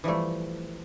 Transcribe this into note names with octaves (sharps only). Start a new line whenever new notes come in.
E3 F3 G3 A3